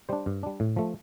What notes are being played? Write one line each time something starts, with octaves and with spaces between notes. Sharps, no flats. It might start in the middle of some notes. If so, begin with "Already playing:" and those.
G3 D4 C5
G2
G3 D4
A2
F3 A3